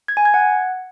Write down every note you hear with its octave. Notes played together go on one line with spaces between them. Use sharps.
G#6
G#5
G#6
F#5